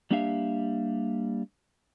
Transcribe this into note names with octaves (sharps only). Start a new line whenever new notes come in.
G3 A#3 D4 G4 E5 F5